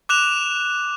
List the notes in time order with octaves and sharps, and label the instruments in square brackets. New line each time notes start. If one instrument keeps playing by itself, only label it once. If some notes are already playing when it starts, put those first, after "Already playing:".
[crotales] D6 F#6 E7 F7